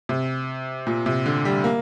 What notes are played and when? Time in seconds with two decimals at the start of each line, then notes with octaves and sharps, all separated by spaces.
0.09 C3
0.87 A#2
1.06 C3
1.26 D3
1.45 G3
1.64 A#3